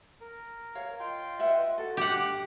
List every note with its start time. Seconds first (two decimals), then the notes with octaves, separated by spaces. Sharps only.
0.21 A#4
0.75 C#5 F5
1.00 F4 D#5 G5 C6
1.39 B4 E5 F#5
1.78 F#4 A4
1.97 D4 G4 F#5 D6